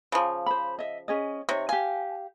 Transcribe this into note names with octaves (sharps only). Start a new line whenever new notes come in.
C#3 F3
C5 B5
D#5 E5
C#4 G#4 D#5
C3 D#4 C#5
G4 F5 G#5